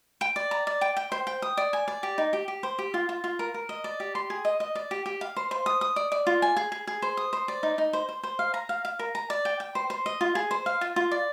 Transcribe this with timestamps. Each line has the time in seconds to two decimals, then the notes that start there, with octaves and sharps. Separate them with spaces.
0.21 G5
0.36 D5
0.51 A#5
0.67 D5
0.81 G5
0.97 G5
1.12 C5
1.27 G5
1.42 D#6
1.57 D5
1.73 G#5
1.88 D5
2.03 G4
2.18 D#4
2.33 G4
2.48 G4
2.63 C5
2.79 G4
2.94 F4
3.09 F4
3.24 F4
3.39 A#4
3.54 A#4
3.69 D#5
3.84 D5
4.00 G4
4.15 C6
4.30 G#4
4.45 D#5
4.60 D#5
4.75 D5
4.91 G4
5.06 G4
5.21 F5
5.36 C5
5.51 C5
5.66 D#6
5.81 D#6
5.96 D5
6.12 D5
6.27 F4
6.42 G#5
6.56 G#4
6.72 G#4
6.87 G#4
7.02 C5
7.17 D#6
7.33 C5
7.48 D5
7.63 D#4
7.78 D#4
7.93 C5
8.09 C5
8.23 C5
8.39 F5
8.54 A#5
8.69 F5
8.85 F5
8.99 A#4
9.15 A#5
9.30 D5
9.45 G5
9.60 G5
9.75 C5
9.90 C5
10.06 D#5
10.21 F4
10.35 G#4
10.51 C5
10.66 F5
10.81 F4
10.96 F4
11.11 D5